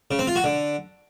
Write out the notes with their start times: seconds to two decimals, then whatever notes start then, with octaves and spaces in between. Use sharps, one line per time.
0.11 C#3
0.19 C4
0.27 F4
0.36 F#4
0.44 D3